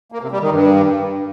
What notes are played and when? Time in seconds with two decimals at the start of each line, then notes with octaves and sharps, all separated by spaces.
0.12 A#3
0.22 C3
0.31 G3
0.41 D#3
0.51 G2